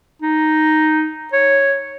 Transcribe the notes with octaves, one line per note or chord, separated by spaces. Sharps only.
D#4
C#5